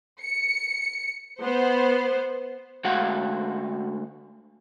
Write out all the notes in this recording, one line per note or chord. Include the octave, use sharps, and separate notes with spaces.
C#7
B3 C5
D2 G#3 F#4 F5 F#5